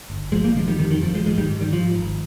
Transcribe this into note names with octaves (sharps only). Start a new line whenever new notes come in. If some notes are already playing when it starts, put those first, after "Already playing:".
G1
G1 F3 G#3
G3 A#3
C3 F3 G#3
D#3 G3
F2 D#3 G3
D#3
G1 F3
F3 G#3
G#2 F3 G#3
D#3 G3
G#2
D#3 G3
G#2 F3
G#1